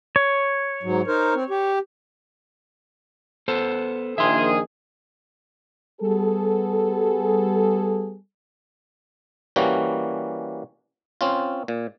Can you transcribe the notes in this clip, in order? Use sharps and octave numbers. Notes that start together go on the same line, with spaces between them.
C#5
G#2 F#3
D#4 A#4 C5
C4
G4
B3 A4 C5
A#1 D#3 G#4 E5 C6
G3 B3 G#4 A4
E3 G3 A#3 C#4 F#4
C4 C#4 F4
A#2